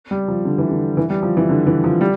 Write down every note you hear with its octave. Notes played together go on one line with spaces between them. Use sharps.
G3
F3
D3
E3
D3
E3
G3
F3
E3
D3
E3
F3
G3